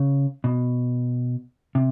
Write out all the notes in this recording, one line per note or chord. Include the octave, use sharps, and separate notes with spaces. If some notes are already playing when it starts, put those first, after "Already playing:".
Already playing: C#3
B2
C3